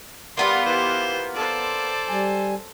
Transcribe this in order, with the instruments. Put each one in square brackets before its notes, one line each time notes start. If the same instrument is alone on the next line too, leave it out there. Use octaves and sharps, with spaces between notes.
[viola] G3 [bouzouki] A#3 B3 F4 [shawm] C6
[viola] E3 G4 [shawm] C5
[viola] A4 C5 [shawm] D5
[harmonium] G3 G#5